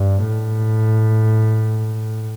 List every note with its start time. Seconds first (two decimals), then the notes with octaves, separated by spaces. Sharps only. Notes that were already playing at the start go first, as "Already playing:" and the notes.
Already playing: G2
0.27 A2